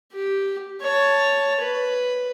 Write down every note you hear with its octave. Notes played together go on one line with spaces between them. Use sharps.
G4
C#5 A5
B4